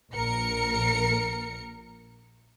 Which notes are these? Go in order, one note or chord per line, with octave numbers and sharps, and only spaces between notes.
A#1 A#4 C#7